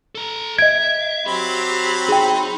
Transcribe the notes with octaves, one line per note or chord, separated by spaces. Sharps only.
A4 A#5
D#5 E5 G#6 D7
F#3 C4 G4 B5
D#4 G#4 G5